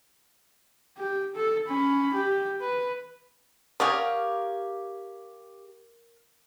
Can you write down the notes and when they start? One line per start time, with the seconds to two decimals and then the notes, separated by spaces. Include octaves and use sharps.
0.97 G4
1.36 A4
1.68 C#4 B5
2.14 G4
2.61 B4
3.80 G4 A#4 C#5 D5 F5 F#5 G#5 D#6